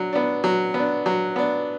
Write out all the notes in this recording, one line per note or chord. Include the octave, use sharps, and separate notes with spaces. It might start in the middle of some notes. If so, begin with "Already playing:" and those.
Already playing: F#3 D4
B3 D4
F#3
B3 D4
F#3
B3 D4